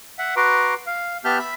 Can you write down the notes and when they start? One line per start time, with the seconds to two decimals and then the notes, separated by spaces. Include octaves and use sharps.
0.19 E5 F#5
0.36 F#4 B4 A#5 C6 D6
0.87 F5
1.25 B3 G4 E5 A5 F6 G6
1.39 E5 B5